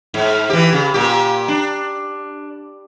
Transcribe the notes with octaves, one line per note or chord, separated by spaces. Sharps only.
G#2
E3 G4
C#3
A#2 G4
D4